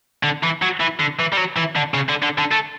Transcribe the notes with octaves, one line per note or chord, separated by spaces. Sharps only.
D3
E3
F#3
E3
D3
E3
G3
F#3
E3
D3
C#3
D3
D3
D3
A3